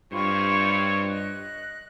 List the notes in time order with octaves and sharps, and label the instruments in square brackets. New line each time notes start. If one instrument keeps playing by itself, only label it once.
[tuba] G2 [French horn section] C3 C4 C#5 [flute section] F4 B5 C#6
[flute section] D#5 F#6